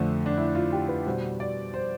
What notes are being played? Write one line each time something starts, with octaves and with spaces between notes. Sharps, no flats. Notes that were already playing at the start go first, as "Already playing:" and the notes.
Already playing: F2 D3 A3 C5
D4
E4
F4
G4
B4
B2 G3 C5
D5
C5